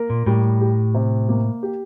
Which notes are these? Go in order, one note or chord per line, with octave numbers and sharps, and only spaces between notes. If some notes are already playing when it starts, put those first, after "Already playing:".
Already playing: A#3 A#4
A#2
A2 G3
G4
C3
A#3
G4